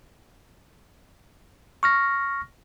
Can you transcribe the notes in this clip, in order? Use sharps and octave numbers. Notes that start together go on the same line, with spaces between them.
C#6 F6 A#6